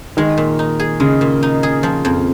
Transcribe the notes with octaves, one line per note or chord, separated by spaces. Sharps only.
D#3 G#3
A#2
D#4
G#4
C#3 G#3
A#2
D#4
G#4
F3
F2